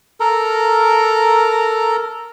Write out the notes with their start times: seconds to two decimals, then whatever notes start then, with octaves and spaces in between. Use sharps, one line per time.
0.20 A4 A#4 A#5